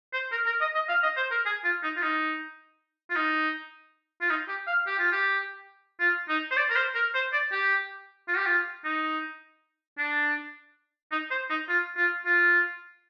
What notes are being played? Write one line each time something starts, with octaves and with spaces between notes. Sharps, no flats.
C5
A#4
A#4
D#5
D#5
F5
D#5
C5
A#4
G#4
F4
D#4
F4
D#4
F4
D#4
F4
D#4
G4
F5
G4
F4
G4
F4
D#4
C5
D5
A#4
C5
A#4
C5
D5
G4
F4
G4
F4
D#4
D4
D#4
C5
D#4
F4
F4
F4